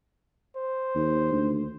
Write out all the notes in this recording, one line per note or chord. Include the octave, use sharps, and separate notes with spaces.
C5
D#2
D2